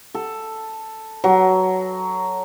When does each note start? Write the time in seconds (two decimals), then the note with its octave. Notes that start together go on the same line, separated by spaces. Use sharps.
0.15 A4
1.24 F#3